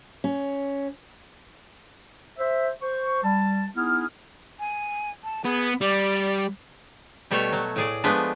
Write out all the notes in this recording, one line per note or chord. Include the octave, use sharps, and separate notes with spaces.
C#4
C5 E5
C5 C#6
G3 A5
B3 D#4 E4 G#4 D#6 F6
G#5
A5
B3 G#4
G3 D5
B2 G3 A3 A4 C#5
F#3
A2 G#4 D5
F3 G#3 A3 B3 D4